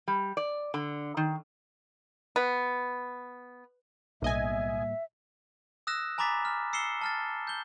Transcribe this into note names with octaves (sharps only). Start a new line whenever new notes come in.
G3
D5
D3
D#3
B3
B1 A2 G3 A#3 D#5 E5 G#5
D#6 E6 F#6 A#6 E7
G#5 A#5 B5 D6 A6 B6
F6
E6 C7 C#7 E7 G7
A5 F6 A6
G6 G7